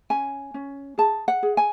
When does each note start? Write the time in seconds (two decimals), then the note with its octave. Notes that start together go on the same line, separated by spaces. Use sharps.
0.10 C#4 G#5
0.54 C#4
0.98 G#4 A5
1.28 F#5
1.43 G#4
1.57 G#5